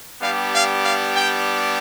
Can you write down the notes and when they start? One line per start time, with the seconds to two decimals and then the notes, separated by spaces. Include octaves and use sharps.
0.21 G3 B3 D4 G4 F5
0.53 F5
0.84 F5
1.15 G5